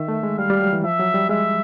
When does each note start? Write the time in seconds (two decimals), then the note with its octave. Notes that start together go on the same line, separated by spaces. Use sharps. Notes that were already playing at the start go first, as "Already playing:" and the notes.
Already playing: D#3 E5
0.08 A3
0.23 G#3
0.38 G3 F5
0.50 G3
0.61 F#3
0.73 E3
0.84 F3 E5
0.99 F#3
1.14 G3
1.30 G#3 E5